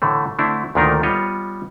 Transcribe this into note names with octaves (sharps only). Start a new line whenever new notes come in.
A2 D3 E3 A3
D3 A3 C4 D4 E4
D2 A#2 D#3 D4 D#4 A#4
G3 B3 F4 C#5 D#5